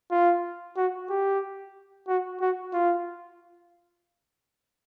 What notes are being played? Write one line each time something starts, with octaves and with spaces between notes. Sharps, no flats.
F4
F#4
G4
F#4
F#4
F4